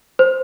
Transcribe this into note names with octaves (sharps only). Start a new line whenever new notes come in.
C5